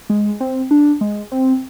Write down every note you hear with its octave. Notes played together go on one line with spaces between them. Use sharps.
G#3
C4
D4
G#3
C4